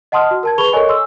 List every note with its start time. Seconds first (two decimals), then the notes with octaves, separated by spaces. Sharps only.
0.12 D#5 F#5 A5 C6 D#6 F6
0.31 F#4
0.43 A#4 A5 G#6
0.58 G#4 B4 B5 C#6 F7 G7
0.73 A4 A#4 C#5 D#5 G#5 C#6
0.89 C6 E6